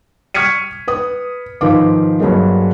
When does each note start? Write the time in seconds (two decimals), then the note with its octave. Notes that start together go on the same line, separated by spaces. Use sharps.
0.34 C#6 F6 G#6 B6 C#7 D#7
0.87 B4 D#6
1.61 G#2 D#3 F3 B4 F5 D6
2.20 G2 F#3 G#3 A#3